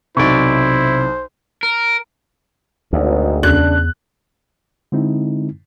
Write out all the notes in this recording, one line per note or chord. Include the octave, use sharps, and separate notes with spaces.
B1 C3 E4 C5 D5 C#6
A#4
G#1 D2 G#2
E2 C#3 D4 F#6
D3 G#3 C4 D#4 E4